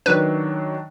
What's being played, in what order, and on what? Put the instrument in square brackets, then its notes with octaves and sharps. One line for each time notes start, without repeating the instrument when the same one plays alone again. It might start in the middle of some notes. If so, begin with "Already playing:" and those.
[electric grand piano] D#3 F#3 D4 [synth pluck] B4